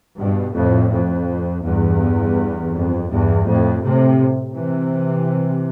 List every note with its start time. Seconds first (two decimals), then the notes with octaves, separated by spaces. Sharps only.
0.18 G2 B2
0.55 F2 A2
0.92 F2
1.64 E2 G2
2.74 F2
3.11 E2 G2
3.47 F2 A2
3.83 A2 C3
4.56 C3 E3